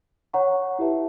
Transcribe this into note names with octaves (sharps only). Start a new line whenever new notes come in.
C#5 F#5 A#5 C#6
E4 G4 B4 E5 A5